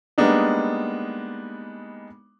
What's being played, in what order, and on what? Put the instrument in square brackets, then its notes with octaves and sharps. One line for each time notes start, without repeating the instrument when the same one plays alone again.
[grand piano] G3 G#3 A#3 B3 D4 D#4